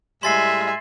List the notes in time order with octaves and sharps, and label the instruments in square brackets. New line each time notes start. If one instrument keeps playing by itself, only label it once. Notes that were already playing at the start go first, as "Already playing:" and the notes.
[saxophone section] A2 G3 G#3 [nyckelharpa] E5 [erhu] G#5 [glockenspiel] C6 A6 C7